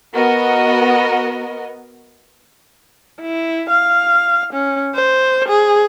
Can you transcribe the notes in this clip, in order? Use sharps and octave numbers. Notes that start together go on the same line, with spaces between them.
B3 F#4 A#4 D#5
E4
F5
C#4
C5
G#4